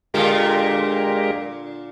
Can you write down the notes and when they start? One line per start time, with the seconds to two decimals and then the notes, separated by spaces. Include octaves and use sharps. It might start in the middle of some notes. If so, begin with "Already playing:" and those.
0.14 A#2 D3 G#3 F4 G4 A#4